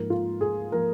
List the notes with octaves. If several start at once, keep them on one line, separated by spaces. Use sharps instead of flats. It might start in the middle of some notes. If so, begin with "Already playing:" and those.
Already playing: G#2 F3 A#3 A#4
F4
G#4
F3 A#3 A#4